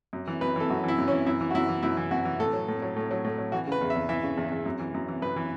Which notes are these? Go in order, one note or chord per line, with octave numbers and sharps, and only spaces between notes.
F#2
E3
F#2 B4
E3 A4
F#2 F#4
E3 E4
F#2
C#4
E3
F#2 E4
E3
F#4
F#2 E4
E3
F#2 E4
E3
F#2 F#4
E3
A2 A4
F#3
A2
F#3
A2
F#3
A2
F#3
E3 F#4
C#3
B4
E2
E5
E2
E3 E5
C#3
E2
E2
F#2
E3
F#2
E3
F#2 B4
E3